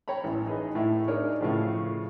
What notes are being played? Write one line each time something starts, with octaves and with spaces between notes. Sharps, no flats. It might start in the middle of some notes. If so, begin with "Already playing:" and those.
C#5 G5 A#5 B5
A1
D#4 G#4 B4 D#5
A2 E4
D4 D#4 G#4 A#4 C#5 D5
A2 C#3 F3